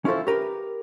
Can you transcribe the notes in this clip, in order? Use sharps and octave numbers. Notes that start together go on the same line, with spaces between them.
C#4 E4 F4 A4 C5
G4 A#4 B4